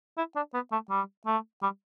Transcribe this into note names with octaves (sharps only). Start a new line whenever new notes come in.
E4
D4
B3
A3
G3
A3
G3